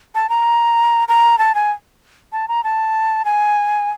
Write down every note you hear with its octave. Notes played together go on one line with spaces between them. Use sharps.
A5
A#5
A#5
A5
G#5
A5
A#5
A5
G#5